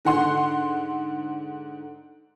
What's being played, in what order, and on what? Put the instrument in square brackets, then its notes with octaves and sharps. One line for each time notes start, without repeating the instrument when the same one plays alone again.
[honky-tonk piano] G#2 D3 F#5 C6